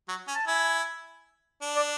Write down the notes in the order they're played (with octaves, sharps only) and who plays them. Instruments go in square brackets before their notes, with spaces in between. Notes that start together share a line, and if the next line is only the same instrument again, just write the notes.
[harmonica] F#3
C#4
[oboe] A5
[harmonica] E4 [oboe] G#5
[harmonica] D4
[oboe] D5